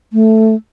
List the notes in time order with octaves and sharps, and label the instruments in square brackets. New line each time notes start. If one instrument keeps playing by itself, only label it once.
[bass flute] A3